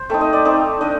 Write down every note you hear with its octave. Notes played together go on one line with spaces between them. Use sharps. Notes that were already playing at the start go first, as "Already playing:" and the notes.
Already playing: C5
A3 C4 D#4 A4
D#5
D5
A3 C4 D#4
A3 D4 D#5